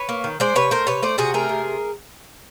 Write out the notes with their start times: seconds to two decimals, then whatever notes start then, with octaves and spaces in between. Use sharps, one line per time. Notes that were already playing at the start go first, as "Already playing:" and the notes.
Already playing: B4 C#5
0.09 A#3
0.24 D#3
0.40 G#3 C5 D5
0.55 C3 B4 C#5
0.71 A3 A#4 C5
0.87 C3 B4 C#5
1.02 A3 C5 D5
1.18 C3 F#4 G#4
1.34 A3 G#4 A#4
1.49 C3